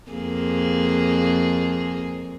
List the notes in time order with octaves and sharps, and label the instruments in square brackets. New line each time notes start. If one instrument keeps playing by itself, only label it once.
[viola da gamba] F2 A#3 G#4